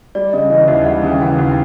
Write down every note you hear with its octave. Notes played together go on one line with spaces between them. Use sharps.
G3 D5
C#3 D#5
E3 D#5
D#2 E5
G3 F#5
C#3
G5
E3 F#5
D#2
G5